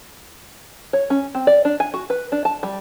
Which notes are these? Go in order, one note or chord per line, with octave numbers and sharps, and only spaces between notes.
C#5
C#4
C4
D5
D4
G#5
F#4
B4
D4
A5
G3